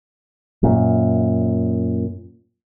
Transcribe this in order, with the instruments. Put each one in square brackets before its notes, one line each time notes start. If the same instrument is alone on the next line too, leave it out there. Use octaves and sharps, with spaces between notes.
[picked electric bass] F#2 A#2